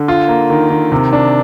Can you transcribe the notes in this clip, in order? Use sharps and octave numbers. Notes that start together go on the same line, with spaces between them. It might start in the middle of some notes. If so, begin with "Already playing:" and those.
Already playing: D3
F4
A#3
D#3
D#3
C3
D4